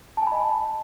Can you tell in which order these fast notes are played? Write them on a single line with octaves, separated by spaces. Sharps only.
A5 G#5 B5 D#5